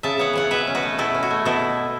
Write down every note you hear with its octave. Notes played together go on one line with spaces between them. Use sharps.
C#3 E5 A5
B3 C#5 F#5
E3 C#5 F#5
B2 B4 E5
C#4
F#4 B4
A3
B2 E4 A4
C#4
F#4
A3
B2 E4 A4